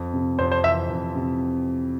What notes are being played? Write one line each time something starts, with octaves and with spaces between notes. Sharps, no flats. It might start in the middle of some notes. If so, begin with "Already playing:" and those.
Already playing: F2
C3
F2 C5
C5
E3 E5
F2
C3